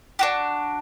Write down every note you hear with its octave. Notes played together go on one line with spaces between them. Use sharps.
D4 F#4 G4